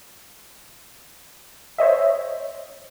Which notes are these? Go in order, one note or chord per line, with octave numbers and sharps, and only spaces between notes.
C5 C#5 D#5 E5